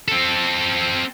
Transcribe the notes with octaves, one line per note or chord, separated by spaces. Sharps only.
C4 A4